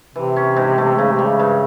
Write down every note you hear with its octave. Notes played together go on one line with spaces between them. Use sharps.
C3 E3
C#4
G#2
A3
G#2 C#3
C3
G3
C#3
G2